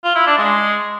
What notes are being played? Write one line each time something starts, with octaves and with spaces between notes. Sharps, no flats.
F4
E4
D4
G#3